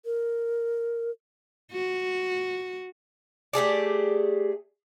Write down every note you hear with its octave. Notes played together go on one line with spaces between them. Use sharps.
A#4
F#4
A3 G4 G#4 D5